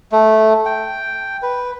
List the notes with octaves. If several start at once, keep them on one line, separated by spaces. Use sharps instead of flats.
A3
G5
B4